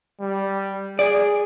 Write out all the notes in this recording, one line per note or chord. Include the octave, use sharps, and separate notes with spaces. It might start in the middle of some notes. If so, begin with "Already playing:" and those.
G3
G#4 D5